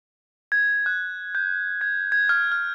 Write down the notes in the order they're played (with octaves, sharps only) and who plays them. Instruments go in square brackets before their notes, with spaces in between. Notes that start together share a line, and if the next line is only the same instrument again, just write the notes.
[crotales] G#6
F#6
G6
G#6
G#6
F6
F6